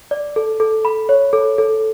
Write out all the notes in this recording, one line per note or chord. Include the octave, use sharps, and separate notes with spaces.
D5
A4
A4
B5
C#5
A4
A4